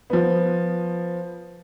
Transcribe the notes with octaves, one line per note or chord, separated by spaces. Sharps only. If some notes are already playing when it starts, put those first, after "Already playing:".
F3 B3